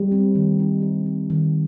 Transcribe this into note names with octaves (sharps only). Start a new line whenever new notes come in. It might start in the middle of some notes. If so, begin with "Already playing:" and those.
Already playing: G3
C4
D#3
D#4
G3
C4
D#3